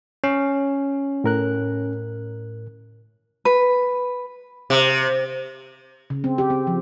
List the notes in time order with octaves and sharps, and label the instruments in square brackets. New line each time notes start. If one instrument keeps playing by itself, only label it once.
[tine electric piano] C#4
[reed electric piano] A2 A#4 F#6
[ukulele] B4
[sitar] C3
[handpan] C#3
C4
G4
C4
F3